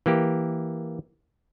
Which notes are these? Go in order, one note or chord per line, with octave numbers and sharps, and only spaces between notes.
E3 A#3 G4